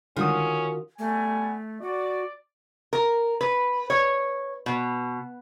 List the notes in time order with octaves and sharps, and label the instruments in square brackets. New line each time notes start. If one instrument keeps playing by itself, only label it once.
[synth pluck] D3 G3 G#3 [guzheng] D#3 [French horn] C#4 [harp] F4 F#4 D#6
[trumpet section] G3 B3 G#5 [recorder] A3
[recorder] F#4 [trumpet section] D5
[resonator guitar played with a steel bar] A#4
B4
C#5
B2